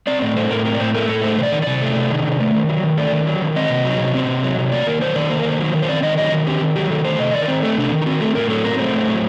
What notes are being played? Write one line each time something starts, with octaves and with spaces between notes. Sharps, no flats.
C4 D5
A2 D5
A3 C5
A2 A#4
C4 A#4
D5
A2 C5
A3 A#4
A2 A4
A3 C5
C3 C5 D5
D#3
C3 D5
A3
C3
D#3
C3
A3
D#3
F#3
D#3
A3 D5
D#3
F#3
D#3
C4 D#5
C3
F#3
C3
C4
C3
F#3
C3
A#3 D5
D#3 A#4
F#3 C5
D#3 D5
A#3 C5
A#4
D#3 C5
F#3
D#3
C5
C4 D5
D#3 D#5
F#3 D#5
D#3
C4 G4
D#3
F#3 G4
D#3 A4
A3 C5
C3 D#5
D#3 D5
A#4
C4 C5
A3 A4
C3 D4
D#3
D#4
C4 F#4
A3 A4
A2 A#4
F#3 A4
C4 A#4
A3 C5
A2
F#3